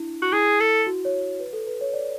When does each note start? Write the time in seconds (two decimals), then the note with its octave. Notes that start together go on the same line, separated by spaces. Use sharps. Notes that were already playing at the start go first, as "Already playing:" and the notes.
Already playing: D4 E4
0.22 F#4
0.32 E4 G#4
0.60 A4
0.87 F#4
1.05 C#5
1.22 C#5
1.40 B4
1.53 A4
1.67 B4
1.81 C#5
1.93 D5